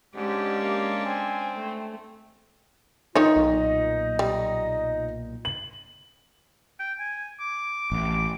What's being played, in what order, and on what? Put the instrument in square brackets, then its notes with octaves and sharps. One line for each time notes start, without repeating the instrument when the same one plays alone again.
[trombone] G#2 [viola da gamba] G#3 C#4 D4 [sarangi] G4
[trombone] A#3
[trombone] C4 [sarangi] G#5
[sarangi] A3
[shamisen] D#3 C#5 [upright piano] D#4 [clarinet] F4
[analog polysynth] B1 A#2 [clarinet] D#5
[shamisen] G3
[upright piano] F#7
[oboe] G5
G#5
D6
[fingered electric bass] A1